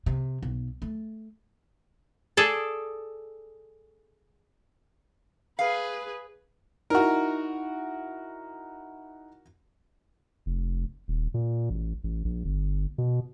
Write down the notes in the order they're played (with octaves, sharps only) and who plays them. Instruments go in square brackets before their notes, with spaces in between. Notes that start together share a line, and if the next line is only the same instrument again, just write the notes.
[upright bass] C3
B1
A3
[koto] G#4 A4 D5
[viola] G#4 B4 [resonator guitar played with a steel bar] F5
[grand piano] D#4 E4 [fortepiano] F#4 A#4
[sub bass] F1
D#1
A#2
A1
A1
A#1
G1
B2